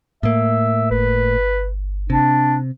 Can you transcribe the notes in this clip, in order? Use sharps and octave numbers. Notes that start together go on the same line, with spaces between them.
A2 A#3 E5
G1 B4
C3 D4